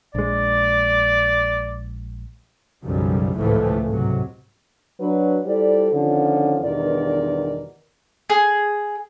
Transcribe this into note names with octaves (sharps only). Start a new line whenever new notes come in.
A#1 G#3 D5
B1 F#2 C#3 F3 G3
G#1 C#2 A2 E3 F3 A3
G#2 C3 F#3
F#3 D4 B4
G3 E4 F4 A4 C5 D5
D3 D#3 F3 C#4 F4
E2 G2 B2 D#3 A#4 D5
G#4